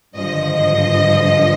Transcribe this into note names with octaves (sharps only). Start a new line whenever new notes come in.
G#1 G2 D3 F3 D#5